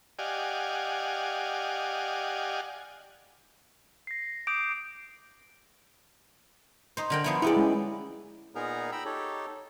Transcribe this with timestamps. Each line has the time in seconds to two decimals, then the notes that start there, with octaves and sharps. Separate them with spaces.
0.19 G4 D5 D#5 F5 F#5 G#5
4.07 A#6 C7
4.47 D6 D#6 G6 D7
6.97 D#4 C5
7.10 D3 A#4 G5
7.24 F3 B3 E4
7.42 B3 E4 G4 G#4 D5
7.57 G#3 C#4
8.55 A#2 B3 D#4 G#4 A#4 A#5
8.92 G5 A#5 B5 E6
9.05 D#4 G4 A4 C#5